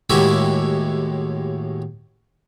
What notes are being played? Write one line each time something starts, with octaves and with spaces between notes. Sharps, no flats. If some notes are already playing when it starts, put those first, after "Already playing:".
D#2 A2 G#3 F#4 G4 E5